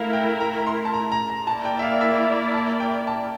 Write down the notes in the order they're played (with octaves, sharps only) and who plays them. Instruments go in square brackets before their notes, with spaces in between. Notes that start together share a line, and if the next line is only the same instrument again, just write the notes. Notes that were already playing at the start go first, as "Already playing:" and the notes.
Already playing: [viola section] A3 E4 A#4 [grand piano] F5
[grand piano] G5
A#5
A#5
C6
A5
A#5
A#5
A#5
[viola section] A#3 E4 A#4 D5 [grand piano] A5
[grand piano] G5
E5
F5
E5
A5
G5
A5